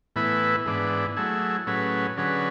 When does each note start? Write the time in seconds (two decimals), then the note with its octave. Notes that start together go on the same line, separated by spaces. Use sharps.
0.16 A2 E3 B3 E4 B4
0.66 G#2 E3 B3 D4
1.17 F#3 A3 E4 G#4
1.67 A2 F#3 C#4 G#4 B4
2.17 D3 F#3 C#4 G#4 B4